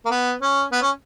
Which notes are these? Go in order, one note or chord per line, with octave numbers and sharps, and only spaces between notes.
A#3
B3
C#4
B3
C#4